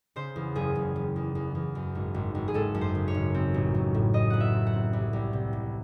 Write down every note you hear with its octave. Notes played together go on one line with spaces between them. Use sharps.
C#3 C5
E2
F#1 G#4
F#1
F#1
E2
E2
E2
F#2
G#1
G#1
G#1
G#4
G#1 A4
F#2
C5
C#3
C#5
G#1
C4
A1
F#3
A2
A1 D#5
A1 F#5
E5
C4
F#5
C4
C2
C2
C3
C3